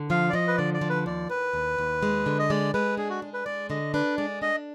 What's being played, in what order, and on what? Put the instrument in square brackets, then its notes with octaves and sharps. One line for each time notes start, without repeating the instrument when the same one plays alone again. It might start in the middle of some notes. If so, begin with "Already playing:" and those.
Already playing: [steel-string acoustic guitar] D3
[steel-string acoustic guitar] F3 [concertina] F5
[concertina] D5
[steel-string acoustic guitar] F3 [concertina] D#5
[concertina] B4
[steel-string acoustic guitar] D3 [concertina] D5
[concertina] D5
[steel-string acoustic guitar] F3
[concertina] B4
[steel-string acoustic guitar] D#2 [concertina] D5
[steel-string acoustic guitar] D#2 [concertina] B4
[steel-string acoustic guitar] D#2
D#2
G#3
D3
[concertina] D#5
[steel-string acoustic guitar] G#3 [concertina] D5
[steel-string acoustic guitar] G#3 [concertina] B4
[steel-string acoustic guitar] D4 [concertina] G#4
[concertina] F#4
[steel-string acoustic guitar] G#3
[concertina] B4
[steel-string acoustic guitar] G#3 [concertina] D5
[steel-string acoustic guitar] D3 [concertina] D#5
[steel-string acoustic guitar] D4 [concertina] B4
[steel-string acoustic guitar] G#3 [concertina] D5
[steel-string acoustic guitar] D4 [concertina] D#5